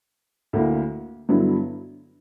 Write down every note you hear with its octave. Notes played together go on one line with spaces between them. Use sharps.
D2 D3 A#3 E4
G2 D3 F#3 B3 E4